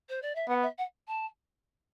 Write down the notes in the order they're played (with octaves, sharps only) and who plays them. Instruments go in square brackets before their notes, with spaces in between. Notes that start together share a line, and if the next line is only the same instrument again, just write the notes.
[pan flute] C5
D5
E5
[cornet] B3 [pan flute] F#5
[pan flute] E5
F#5
A5